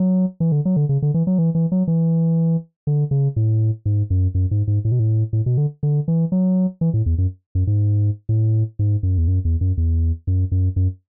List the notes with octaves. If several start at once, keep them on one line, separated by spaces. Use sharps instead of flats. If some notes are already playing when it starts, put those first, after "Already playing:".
Already playing: F#3
E3
D3
F#3
D3
C#3
D3
E3
F#3
E3
E3
F#3
E3
D3
C#3
A2
G#2
F#2
F#2
G#2
G#2
A2
B2
A2
A2
B2
D3
D3
E3
F#3
E3
A2
E2
F#2
F#2
G#2
A2
G#2
F#2
E2
F#2
E2
F#2
E2
F#2
F#2
F#2